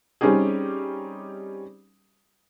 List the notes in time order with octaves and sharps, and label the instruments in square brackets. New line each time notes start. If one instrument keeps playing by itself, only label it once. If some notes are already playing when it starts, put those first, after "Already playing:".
[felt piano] G3 C4 C#4 D#4 G4 G#4